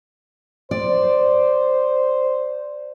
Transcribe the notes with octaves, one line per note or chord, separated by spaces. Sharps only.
C5 D5